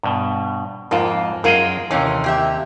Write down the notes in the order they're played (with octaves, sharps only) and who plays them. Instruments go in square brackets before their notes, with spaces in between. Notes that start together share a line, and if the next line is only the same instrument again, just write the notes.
[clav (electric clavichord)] G2 B2
[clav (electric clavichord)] F2 G#2 [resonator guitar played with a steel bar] A#3 F4
[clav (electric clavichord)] F#2 G#4 D#5 [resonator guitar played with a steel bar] F4 A#4
[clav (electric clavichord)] D#2 C3 [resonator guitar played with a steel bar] E3 A3 C#4
[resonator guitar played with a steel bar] A#3 G4 E5